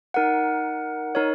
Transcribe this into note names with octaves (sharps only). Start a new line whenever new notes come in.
D#4 A#4 F#5
D#4 A#4 C#5